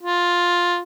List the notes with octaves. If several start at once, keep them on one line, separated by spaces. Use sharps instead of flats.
F4